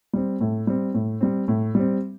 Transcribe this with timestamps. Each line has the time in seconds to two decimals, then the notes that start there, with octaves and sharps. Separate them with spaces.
0.13 G3 C4
0.41 A2
0.67 G3 C4
0.94 A2
1.21 G3 C4
1.48 A2
1.75 G3 C4